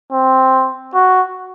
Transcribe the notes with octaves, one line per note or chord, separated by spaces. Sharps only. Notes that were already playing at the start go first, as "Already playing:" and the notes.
C4
F#4